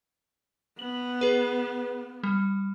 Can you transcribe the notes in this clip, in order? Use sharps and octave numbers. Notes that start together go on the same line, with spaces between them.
B3 F#7
G#4 B4
G3